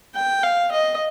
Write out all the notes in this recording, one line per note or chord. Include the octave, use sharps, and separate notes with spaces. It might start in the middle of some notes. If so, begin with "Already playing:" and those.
G5
F5
D#5